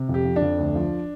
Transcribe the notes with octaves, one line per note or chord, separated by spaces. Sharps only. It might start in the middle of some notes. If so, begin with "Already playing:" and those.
Already playing: C3
F2
G4
F3
D4
F2
D2
F3